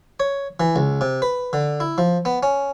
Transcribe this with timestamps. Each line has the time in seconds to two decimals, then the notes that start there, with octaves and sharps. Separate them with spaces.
0.20 C#5
0.60 E3
0.76 C#2
1.01 C3
1.22 B4
1.53 D3
1.80 E4
1.98 F3
2.25 B3
2.43 C#4